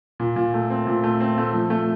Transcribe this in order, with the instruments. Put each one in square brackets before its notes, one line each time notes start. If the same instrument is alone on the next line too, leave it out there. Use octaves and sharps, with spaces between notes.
[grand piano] A#2
A#2
A3
C4
A#2
A3
C4
A3
F3
A3